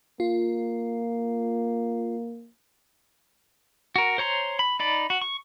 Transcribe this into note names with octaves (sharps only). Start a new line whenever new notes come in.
A#3 F4
F#4 A#4
C5 C#5 A#5 C6
B5
D#4 D5 B5
F#4
C#6